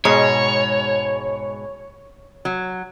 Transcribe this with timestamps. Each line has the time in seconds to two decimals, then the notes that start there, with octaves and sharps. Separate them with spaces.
0.05 G#2 B2 G#3 C#5
2.45 F#3